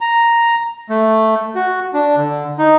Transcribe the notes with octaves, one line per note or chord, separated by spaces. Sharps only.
A#5
A3
F#4
D4
D3
D#4